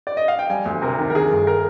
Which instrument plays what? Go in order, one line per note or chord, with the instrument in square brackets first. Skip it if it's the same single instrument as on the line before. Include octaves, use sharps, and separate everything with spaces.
[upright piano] D5
D#5
F5
G5
G3 G#5
D2
C3 A#4
D#3
A#4
D#3 G#4
G1
A#4